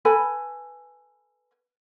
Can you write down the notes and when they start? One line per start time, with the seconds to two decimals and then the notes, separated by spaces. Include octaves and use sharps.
0.05 A4 B4 G#5 B5